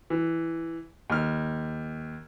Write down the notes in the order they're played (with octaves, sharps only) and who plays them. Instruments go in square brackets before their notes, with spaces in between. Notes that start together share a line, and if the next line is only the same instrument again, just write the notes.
[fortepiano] E3
D#2 F6